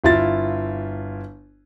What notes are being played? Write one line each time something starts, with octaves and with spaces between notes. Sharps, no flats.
G1 E4 F4 A6